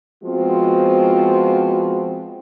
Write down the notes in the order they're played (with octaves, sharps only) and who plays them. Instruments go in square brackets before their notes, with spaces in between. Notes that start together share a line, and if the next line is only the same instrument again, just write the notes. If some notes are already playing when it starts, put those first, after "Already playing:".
[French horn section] F3 G#3 B3 C4 F4 F#4